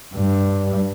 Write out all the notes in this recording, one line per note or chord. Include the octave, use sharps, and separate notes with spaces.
G2